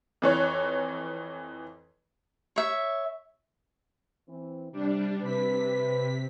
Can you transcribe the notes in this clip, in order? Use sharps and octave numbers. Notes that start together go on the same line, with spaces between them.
F2 E3 C#5 F#6
C#5 E5
E3 C4
C3 G3 D4
C3 B4 B6